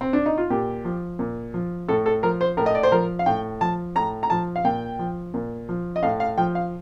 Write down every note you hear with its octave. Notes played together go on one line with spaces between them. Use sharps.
C4
D4
D#4
F4
A#2 G4
F3
A#2
F3
A2 A4
A4
F3 A#4
C5
A2 A#4
D#5
D5
C5
F3 A#4
F5
A2 G5
F3 A5
A2 A#5
A#5
F3 A5
F5
A#2 G5
F3
A#2
F3
D#5
A2 F5
F5
F3 G5
F5